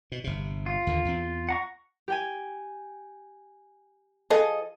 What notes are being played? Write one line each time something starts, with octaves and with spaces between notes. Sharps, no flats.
B2
G1 C3
F4
D#2 D3
E2 C4
F#5 A#5 C#6
G4 G5 G#5
F3 G#4 A4 D#5